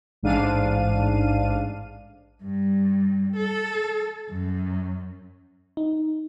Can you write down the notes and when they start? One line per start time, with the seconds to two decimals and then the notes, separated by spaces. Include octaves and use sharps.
0.23 A1 G#2 D4 F5 D#7
2.42 G2
3.36 A4
4.29 F#2
5.77 D#4